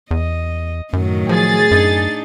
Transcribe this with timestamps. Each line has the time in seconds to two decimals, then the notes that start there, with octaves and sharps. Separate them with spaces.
0.11 E2 D#5
0.93 F#2 A2 D#3 F#3
1.29 F3 G#4 A6
1.71 F#2 D4 D#4